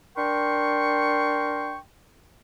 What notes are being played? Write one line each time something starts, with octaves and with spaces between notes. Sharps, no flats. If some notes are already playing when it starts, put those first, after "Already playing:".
D4 A#4 G5 C6 C#6